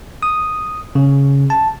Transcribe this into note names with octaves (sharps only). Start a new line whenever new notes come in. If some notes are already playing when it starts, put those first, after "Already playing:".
D#6
C#3
A5